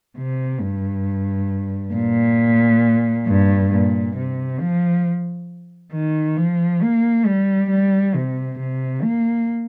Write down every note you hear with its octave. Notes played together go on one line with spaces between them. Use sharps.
C3
G2
A#2
G2
A#2
C3
F3
D#3
F3
A#3
G3
G3
C3
C3
A#3